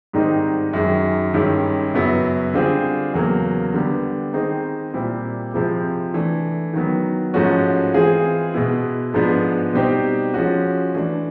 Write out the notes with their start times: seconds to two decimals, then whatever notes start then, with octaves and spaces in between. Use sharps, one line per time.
0.13 G#2 D#3 G3 C4 D#4
0.73 F#2 D#3 G#3
1.34 G2 D#3 G#3 C#4 E4
1.94 F#2 C#3 F#3 B3 E4
2.54 D3 G3 C4 F4 G#4
3.14 E2 C#3 F#3 A#3
3.73 D3 G3 B3
4.33 D#3 G#3 C4 D#4
4.94 A#2 G3 C4 E4
5.54 C3 F3 G#3 C4 E4
6.14 E3 A3 D4
6.73 D#3 F#3 B3
7.34 G#2 F3 A3 C#4 F#4
7.94 E3 G#3 C4 F4 G#4
8.54 B2 G#3 B3 E4
9.14 G#2 F3 G#3 B3 D4
9.73 B2 G3 C4 D#4 G4
10.34 F3 G#3 C#4 F#4
10.94 E3 A3 D4